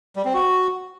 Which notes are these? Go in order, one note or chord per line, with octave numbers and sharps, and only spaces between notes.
G3
C4
F#4